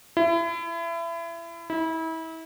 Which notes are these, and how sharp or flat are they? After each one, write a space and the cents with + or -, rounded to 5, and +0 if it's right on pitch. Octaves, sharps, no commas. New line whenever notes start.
E4 +30
E4 -30